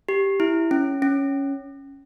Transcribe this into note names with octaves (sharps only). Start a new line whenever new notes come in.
G4
E4
C#4
C#4